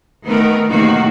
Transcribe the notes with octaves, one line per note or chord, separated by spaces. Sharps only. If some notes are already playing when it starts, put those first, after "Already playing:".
D#3 A3 B3 A#4
A2 C3 D#3 A#3 F#4